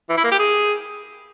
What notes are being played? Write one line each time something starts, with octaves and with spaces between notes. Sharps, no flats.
E3
E4
A#3
G4
G#4